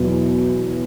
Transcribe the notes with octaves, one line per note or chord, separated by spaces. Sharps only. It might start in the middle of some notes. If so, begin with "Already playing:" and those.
Already playing: E2 B2 F#3